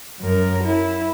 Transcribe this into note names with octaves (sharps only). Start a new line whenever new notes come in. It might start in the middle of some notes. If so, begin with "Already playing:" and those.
F#2 A#4
E4